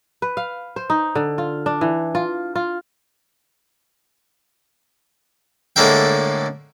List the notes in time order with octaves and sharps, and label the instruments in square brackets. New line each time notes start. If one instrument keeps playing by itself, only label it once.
[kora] B4
F5
C5
D#4
D3
F4
D4
E3
F4
F4
[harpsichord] A2 D3 G#3 A#3 E5 G5